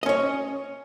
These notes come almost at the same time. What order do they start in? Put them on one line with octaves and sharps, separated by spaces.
D#5 C#4 C#5